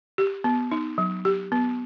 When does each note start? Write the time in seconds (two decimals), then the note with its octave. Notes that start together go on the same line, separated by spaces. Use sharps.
0.18 G4
0.44 B3
0.72 D#4
0.98 F#3
1.25 G4
1.52 B3